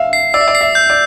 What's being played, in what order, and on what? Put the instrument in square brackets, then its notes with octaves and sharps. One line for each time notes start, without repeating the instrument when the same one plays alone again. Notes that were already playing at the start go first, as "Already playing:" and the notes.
Already playing: [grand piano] E5 F5
[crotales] C7
[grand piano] D5 [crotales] E6
[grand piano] E5
D5
[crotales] C7
[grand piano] E5
[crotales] G6
[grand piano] D5